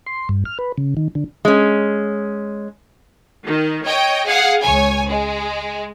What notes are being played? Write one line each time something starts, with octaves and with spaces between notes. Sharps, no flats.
C6
G2
F6
B4
C#3
D#3
D3
G#3 C#4
D#3
C#5 D#5 G5
G#4 F5 F#5
C#2 C#5 G#5
G#3